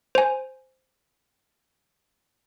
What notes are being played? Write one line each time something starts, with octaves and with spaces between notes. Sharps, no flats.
C5 G#5